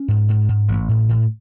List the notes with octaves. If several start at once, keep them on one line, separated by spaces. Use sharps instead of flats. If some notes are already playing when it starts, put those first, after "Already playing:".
Already playing: C#4
G#2
G#2
G#2
A1
A2
A2